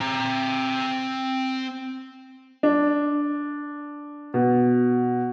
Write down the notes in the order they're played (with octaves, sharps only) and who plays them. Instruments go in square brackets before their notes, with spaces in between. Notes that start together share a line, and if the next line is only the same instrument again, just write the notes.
[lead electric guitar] C4 A#5
[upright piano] D4
B2